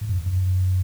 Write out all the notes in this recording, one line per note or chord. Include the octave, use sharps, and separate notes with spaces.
G#2
F#2
E2
F#2